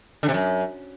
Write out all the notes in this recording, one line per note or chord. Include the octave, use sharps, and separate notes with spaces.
D3
C3
F#2